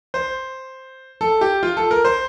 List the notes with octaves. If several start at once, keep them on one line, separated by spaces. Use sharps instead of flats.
C5
A4
G4
F4
A4
A#4
C5